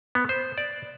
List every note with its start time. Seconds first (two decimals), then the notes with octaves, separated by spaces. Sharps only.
0.15 B3
0.29 C5
0.58 D5